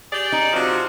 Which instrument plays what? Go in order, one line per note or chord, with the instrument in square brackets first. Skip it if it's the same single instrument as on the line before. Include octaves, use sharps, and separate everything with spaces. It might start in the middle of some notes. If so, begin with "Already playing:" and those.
[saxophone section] G4 G#4 D5
[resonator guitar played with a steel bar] D#4
[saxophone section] C3 F3 F#4